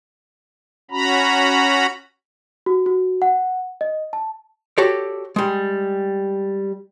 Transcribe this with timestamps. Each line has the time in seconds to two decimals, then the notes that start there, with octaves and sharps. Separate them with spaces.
0.91 C#4 F#4 A#5 B5
2.66 F#4
2.86 F#4
3.22 F#5
3.81 D#5
4.13 A5
4.78 F#4 G4 A4 C#5 D5
5.36 G3 G#3